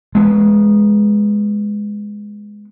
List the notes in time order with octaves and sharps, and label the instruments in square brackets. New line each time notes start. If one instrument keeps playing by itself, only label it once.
[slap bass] G#3 B3